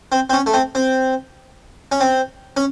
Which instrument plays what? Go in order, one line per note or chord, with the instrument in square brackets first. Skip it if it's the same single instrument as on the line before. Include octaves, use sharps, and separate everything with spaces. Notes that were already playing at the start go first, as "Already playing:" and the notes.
[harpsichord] C4
C4
C#4
A3
C4
C4
C#4
C4
C#4